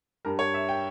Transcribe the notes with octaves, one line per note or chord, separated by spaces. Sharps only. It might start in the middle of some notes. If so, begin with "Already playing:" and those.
G2 G3 A#4
C#5
E5
G5